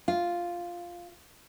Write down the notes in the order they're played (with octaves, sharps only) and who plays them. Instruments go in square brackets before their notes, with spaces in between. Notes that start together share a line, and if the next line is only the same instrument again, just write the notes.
[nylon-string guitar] F4